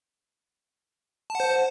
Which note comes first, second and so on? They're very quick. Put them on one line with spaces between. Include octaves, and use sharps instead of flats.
A5 F#5 C5